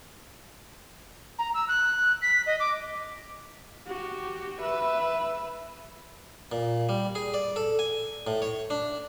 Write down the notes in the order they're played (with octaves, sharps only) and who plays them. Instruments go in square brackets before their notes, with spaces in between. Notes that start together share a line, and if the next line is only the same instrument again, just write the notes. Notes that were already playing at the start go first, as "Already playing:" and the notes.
[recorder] A#5
E6
F#6
B6
D#5
D6
[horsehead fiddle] F#4 G4
B4 E5
[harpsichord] A#2
G3
G#4
D5
A4
G#5
A2
C#5
D4